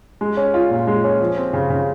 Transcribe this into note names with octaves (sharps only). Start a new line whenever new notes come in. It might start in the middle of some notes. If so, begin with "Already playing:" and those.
G#3
C#4
F4
A#2
G#3
C#4
F3
C4
C#3
C#3